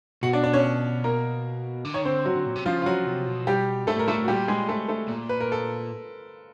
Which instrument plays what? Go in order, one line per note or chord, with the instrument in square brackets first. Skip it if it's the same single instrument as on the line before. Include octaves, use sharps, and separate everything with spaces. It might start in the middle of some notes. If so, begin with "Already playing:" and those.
[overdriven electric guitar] B2 [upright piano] F#4 F#5
[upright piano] D4 D5
D4 D5
C#4 C#5
A#3 A#4
[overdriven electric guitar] D3
[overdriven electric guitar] D#3 [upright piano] C#5
[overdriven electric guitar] D3 [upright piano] C4 C5
[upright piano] F#3 F#4
[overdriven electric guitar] D3
A#2
C3
[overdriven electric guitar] C#3 [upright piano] F3 F4
[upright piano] F4
F#3 F#4
[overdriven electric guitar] C3
B2
[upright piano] G3 G4
[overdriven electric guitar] A2 [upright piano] A3 A4
[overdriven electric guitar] A2 [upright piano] A#4
[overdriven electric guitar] A#2 [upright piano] A3 A4
[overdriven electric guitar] A2
[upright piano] F#4
[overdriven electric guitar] A#2 [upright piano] G3 G4
[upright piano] G#3 G#4
A3 A4
A3 A4
[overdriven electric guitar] A#2
[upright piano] B4
A#4
A4